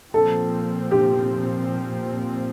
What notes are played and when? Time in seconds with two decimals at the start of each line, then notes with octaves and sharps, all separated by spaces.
0.14 A#2 F3 C4 A4
0.91 G4